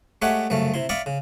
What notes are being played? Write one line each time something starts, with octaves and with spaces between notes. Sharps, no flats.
G#3 A3 G4 C#5 E5 F#5
C2 F#2 C#3 A3
C3 E4 C6
D5 E5 F5 B5 C#6 D#6
C#3